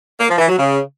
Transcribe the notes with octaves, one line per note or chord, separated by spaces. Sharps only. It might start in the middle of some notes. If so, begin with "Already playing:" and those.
A#3
F3
E3
F#3
C#3